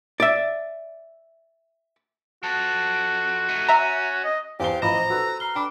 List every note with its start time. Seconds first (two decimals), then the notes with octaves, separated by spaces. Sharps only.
0.20 D5 E5
2.43 F3 F#4 A4
3.49 A3 D#4
3.69 C#4 E5 A#5
4.24 D#5
4.60 E2 G4 C5 F5 G7
4.82 A1 F3 F4 D#5 A#5 B5 E7
4.95 C5
5.10 F#4 A4 B4 E6
5.40 A#5 F6 C7 G7
5.55 D4 G5 B5 D6